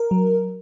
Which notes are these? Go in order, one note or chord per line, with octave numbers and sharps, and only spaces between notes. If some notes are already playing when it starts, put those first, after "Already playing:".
Already playing: A#4
F#3